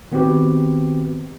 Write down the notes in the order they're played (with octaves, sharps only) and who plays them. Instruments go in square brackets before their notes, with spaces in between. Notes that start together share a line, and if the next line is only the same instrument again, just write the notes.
[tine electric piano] D#3 B3 C4 F#4 G4 B4